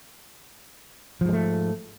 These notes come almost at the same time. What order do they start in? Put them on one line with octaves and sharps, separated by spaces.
F3 G#2 G#3 A3